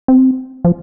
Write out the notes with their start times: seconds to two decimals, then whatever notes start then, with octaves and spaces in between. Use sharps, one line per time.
0.08 C4
0.65 F3